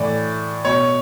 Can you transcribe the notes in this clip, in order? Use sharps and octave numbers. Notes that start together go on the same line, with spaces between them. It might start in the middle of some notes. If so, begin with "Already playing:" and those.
Already playing: A2 E3 D5
B2 C#5